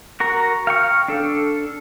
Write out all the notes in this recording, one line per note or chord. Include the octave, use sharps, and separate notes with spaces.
F#4 A#4 A#5
F5 G5 C#6 F6
D4 A4